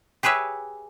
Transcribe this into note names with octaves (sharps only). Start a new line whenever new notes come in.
G4 G#4 B4 C#5 E5